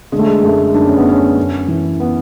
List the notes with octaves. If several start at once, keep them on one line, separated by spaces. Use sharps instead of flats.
D3 G#3
A3
G#3
F#2 A3
F#2 D4
C#4
B3
F#2 C#4
F#2
E3
B3